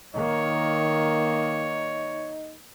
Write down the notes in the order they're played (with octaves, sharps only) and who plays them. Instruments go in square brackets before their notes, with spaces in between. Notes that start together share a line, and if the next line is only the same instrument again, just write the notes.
[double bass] D#3 A#3 [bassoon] D#4 [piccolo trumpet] C#5